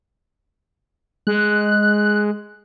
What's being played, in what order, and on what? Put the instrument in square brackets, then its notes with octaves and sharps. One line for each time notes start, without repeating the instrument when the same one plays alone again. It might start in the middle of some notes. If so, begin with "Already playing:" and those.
[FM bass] G#3 [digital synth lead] F#6